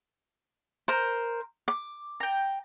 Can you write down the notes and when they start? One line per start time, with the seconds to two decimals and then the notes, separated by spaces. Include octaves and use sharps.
0.88 A#4 C5
1.68 D6
2.20 G5 A#5